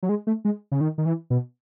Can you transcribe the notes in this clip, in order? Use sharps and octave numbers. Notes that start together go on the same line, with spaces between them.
F#3
G#3
A3
G#3
C#3
D#3
D#3
E3
B2